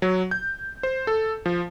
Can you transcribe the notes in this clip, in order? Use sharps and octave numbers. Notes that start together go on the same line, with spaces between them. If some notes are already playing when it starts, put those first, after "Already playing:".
F#3
G6
C5
A4
F3